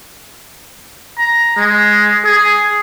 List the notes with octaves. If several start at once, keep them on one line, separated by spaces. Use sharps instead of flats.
A#5
G#3
G#4